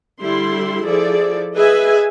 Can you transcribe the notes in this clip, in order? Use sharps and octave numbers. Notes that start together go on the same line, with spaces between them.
D3 G3 E4 C6
F3 E4 G#4 A4 D5
G#4 B4 D#5 E5 G#5